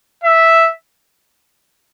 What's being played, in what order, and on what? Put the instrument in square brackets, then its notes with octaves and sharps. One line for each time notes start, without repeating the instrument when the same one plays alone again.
[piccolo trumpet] E5